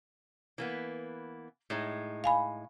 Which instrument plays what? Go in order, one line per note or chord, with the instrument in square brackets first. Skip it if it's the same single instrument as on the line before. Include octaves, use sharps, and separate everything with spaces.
[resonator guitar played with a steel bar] E3 A#3 B3
A2 G#3 D#4
[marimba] F5 G#5 B5